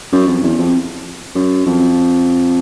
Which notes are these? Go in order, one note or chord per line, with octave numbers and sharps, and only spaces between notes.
F#2
F2
E2
F2
F#2
F2